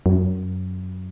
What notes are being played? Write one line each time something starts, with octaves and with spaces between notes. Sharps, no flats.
F#2